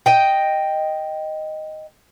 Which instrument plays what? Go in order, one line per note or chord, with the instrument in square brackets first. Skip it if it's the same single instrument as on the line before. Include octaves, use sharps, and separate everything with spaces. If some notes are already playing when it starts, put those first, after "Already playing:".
[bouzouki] D#5 G5